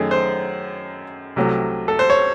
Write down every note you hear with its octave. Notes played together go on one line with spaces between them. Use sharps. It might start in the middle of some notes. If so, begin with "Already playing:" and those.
Already playing: F#2 D#3 A3 G#4
C5
C2 C3 F#3 A3
A4
C5
C#5